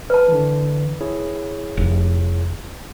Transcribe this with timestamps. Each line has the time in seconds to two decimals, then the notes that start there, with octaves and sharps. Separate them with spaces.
0.10 B4 A5
0.28 D3 E3
1.01 E4 G#4 C#5
1.77 F1